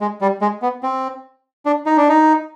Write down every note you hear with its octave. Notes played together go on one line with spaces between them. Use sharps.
G#3
G3
G#3
B3
C4
D4
D#4
D4
D#4